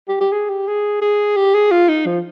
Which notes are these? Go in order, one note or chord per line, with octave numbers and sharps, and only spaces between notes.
G4
G4
G#4
G4
G#4
G#4
G4
G#4
F4
D#4
F3